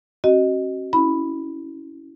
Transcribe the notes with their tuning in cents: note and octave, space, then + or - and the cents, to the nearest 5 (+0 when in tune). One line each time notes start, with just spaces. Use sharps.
C4 +45 F#4 +30 D#5 +0
C#4 +10 E4 -10 B5 +0